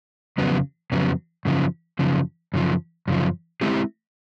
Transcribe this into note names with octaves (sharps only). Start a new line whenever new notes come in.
F2 C#3 F#3 B3
F2 C#3 F#3 B3
F#2 C#3 F3
F#2 C#3 F3
F#2 C#3 F3
F#2 C#3 F3
G#3 C4 E4 G4